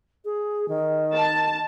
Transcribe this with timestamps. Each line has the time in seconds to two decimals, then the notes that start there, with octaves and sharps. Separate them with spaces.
0.25 G#4
0.68 D#3
1.15 A5